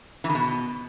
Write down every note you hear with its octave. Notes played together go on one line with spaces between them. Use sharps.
E3
D#3
B2